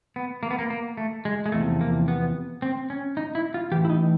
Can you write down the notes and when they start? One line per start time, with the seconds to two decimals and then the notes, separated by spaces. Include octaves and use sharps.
0.16 B3
0.43 A#3
0.51 B3
0.59 A#3
0.70 A#3
0.97 A3
1.25 G#3
1.46 G#3
1.52 E2 C3 F3 A3
1.81 A#3
2.08 B3
2.62 C4
2.90 C#4
3.17 D#4
3.35 E4
3.54 F4
3.71 E3 G4
3.76 A2
3.85 E4
3.90 D#4